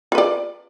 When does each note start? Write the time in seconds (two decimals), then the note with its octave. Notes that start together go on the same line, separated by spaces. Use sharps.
0.12 F4
0.15 B4
0.18 D5